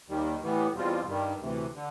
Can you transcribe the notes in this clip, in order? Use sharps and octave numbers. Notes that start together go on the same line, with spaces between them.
D#2 D#3 G3
A2 E3 G3 B3
E2 B2 G3 C4 F4
G2 D#3 G3
D2 C3 E3
D3